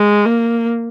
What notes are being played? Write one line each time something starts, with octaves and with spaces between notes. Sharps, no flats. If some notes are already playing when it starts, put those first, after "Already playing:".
Already playing: G#3
A#3